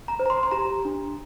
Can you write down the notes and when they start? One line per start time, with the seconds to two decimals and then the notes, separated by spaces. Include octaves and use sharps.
0.08 A#5
0.20 C5
0.26 A#5
0.30 C6
0.43 C6
0.51 G4 A#5
0.85 D4